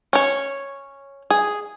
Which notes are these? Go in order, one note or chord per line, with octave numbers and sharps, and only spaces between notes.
C#4 C#5
G#4